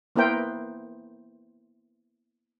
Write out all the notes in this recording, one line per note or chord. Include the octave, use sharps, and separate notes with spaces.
A#3 B3 E4 A#4 C5 G5